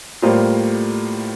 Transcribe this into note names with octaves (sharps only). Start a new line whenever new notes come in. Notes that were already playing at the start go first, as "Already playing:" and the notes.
A2 G3 A#3 F4 C5